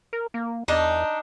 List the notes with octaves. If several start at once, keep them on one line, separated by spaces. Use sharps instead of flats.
A#4
A#3
E2 D4 D#4